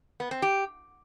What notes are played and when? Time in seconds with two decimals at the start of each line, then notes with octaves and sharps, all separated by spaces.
0.20 B3
0.31 C4
0.42 G4